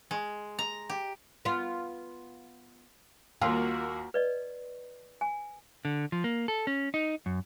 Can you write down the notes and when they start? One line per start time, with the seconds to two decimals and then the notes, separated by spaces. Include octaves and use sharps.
0.11 G#3
0.59 A#5
0.89 G4
1.45 B3 F4
3.41 D#2 A#3 F4 F#4 A#4
4.14 B4 D5 D#5
5.21 G#5
5.85 D3
6.12 F3
6.24 A#3
6.48 A4
6.67 C#4
6.94 D#4
7.26 F#2